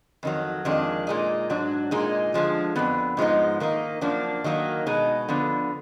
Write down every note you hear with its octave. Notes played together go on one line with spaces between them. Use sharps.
F2 D#3 F#3
F2 D#3 G#3 D4
A#2 G#3 D#4
G#2 F#3 D4
A#2 G#3 D#4
D3 F3 G#3
F2 D3 F3 B3
G#2 F3 G#3 B3 D#4
D#3 A#3 D#4
F#2 F3 A#3 D4
D#3 F#3 A#3 D#4
B2 G#3 D#4
D3 F3 B3